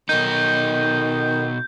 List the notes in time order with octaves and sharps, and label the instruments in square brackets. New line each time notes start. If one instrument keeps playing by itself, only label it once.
[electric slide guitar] B2 D#4 [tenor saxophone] D#3 [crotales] G6